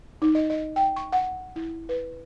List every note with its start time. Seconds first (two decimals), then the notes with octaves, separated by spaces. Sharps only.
0.22 D#4
0.35 D#5
0.50 D#5
0.76 G5
0.96 C#6
1.13 F#5
1.56 E4
1.89 B4